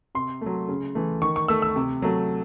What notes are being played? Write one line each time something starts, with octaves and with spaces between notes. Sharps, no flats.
C3 C6
F#3 A3
C#3
E3 A3
D#3 C#6
C#6
A3 E6
E6
C3
F#3 A3